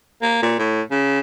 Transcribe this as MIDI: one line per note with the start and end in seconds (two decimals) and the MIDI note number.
0.22 0.40 58
0.43 0.55 46
0.59 0.82 45
0.91 1.19 49